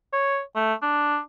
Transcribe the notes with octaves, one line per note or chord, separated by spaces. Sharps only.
C#5
A3
D4